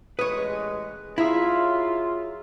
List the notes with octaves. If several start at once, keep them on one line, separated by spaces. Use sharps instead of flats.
A1 G#3 B4 C#5 D#6 F#6
F#3 E4 F4 G#4 E5 A#5